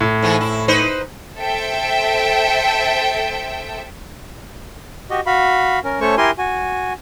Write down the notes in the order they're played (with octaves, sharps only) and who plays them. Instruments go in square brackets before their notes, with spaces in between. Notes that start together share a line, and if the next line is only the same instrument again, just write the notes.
[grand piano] A2
[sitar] G#2 E3 A3
E4
D#4 B4 C5
[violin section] A4 C5 E5 G5
[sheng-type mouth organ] F#4 G4 D#5
F#4 F5 B5
C#4 A#4
A3 C#4 A4 C5 C#5 C#6
E4 G4 A#4 G#5 C6
F#4 G#5